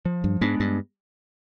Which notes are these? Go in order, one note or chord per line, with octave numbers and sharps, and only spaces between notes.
F3
G2
G#2 G#3 B3 D4
G2